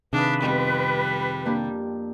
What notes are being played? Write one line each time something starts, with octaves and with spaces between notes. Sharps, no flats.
C3 D#3 D4 G#4 B4 F5 D#6
F2 G3 B3 C4
A#3 D4 G4